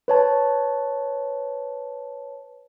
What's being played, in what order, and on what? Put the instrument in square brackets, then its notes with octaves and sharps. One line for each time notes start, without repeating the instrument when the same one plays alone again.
[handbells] B4 C#5 A5